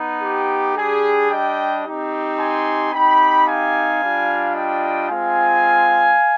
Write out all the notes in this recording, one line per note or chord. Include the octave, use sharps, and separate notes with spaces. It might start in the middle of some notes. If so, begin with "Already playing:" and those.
Already playing: B3 D#4
G4
G3 D4 G4 G#4
D#5 G5
C4 D#4 G4
G#5 C6
C4 D#4 G4 G5 B5
F5 G#5
G3 D4 F4
D#5 G5
G#3 C4 F4 F5 G#5